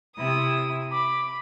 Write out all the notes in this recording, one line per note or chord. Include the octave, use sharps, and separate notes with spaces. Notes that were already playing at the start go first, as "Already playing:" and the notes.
C3 E4 D#6
B5 D6